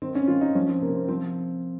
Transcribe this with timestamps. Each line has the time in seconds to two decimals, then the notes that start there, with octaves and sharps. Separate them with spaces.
0.02 D#3 C4
0.15 C#4
0.28 D#3 F4
0.41 D#4
0.55 F3 C#4
0.69 C4
0.81 C3 A#3
0.95 C4
1.08 F3 C4